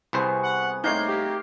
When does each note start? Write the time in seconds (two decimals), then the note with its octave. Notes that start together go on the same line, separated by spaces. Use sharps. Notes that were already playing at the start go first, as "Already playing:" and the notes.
0.13 C2 C3 B3 G#4 C5 C#6
0.43 F#5
0.84 A3 A#3 C4 D#4 C#5 C6 G6
1.08 G4